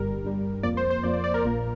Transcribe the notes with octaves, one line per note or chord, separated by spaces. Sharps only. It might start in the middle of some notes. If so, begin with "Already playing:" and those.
Already playing: G1 G2 G3 A#4
G1 G2 G3
F2 F3 A#3 D5
C5
C5
F2 F3 A#3 D5
D5
D5
A#4
A#1 A#2 A#3